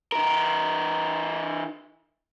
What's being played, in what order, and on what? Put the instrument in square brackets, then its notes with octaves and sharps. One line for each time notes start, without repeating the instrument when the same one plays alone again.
[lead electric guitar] E3 A#4